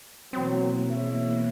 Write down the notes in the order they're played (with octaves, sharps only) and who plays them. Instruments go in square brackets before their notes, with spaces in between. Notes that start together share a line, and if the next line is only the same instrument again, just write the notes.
[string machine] B2 E3 A#3 [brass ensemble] F#3 [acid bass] C4
[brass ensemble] G#3 C#5 E5